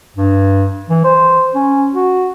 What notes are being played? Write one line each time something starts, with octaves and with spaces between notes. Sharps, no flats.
G2
E3
C5
C#4
F#4